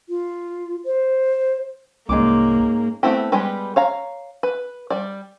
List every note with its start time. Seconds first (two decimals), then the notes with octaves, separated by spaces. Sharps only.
0.09 F4
0.86 C5
2.09 C2 G#2 A#3 C#4 D6
3.03 A3 B3 C4 E4 G4
3.32 G3 G#3 B3 G4 B4
3.76 C#5 F5 A#5
4.43 B4
4.90 G3 D5